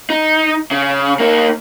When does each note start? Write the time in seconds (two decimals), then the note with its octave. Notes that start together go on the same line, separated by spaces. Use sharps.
0.10 D#4
0.71 C#3
1.20 A#3 D#4